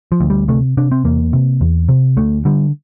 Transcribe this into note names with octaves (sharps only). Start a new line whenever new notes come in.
F3
D2
G3
C3 A3
C3 D4
C4
E2 A#3
C3
E2
C3
D2 A3
D3 G3